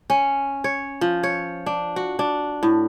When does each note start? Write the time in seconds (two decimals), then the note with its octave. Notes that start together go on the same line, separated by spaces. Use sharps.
0.10 C#4
0.64 C#5
1.01 F3
1.23 C#5
1.66 D4
1.96 F#4
2.19 D4
2.63 A2